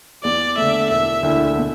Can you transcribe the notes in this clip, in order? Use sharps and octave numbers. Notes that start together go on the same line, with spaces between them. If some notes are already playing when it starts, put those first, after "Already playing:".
E2 D5
D3 A3 E5
E1 E5
D2 D3 A3 E4
B2